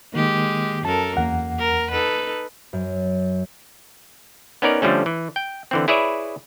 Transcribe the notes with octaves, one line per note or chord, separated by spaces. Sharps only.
D#3 G#3 A#3 G4
F#2 A4 A#4 A5
E2 A#3 F#5
A#4
D#4 A4 B4
F#2
B3 C#4 D#4 A#4 D5
D3 F3 G3 A3 C#4
E3
G5
D3 E3 C4
E4 G#4 B4 C#5 D5 E5